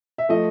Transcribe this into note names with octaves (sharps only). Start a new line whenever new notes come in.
E5
F3 A3 D#5